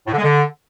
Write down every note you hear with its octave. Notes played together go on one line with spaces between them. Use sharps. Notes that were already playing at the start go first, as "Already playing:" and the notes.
A2
D3
G#3
D3